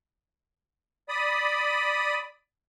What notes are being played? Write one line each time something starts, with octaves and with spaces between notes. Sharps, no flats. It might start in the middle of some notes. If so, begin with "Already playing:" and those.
D5 B5 D#6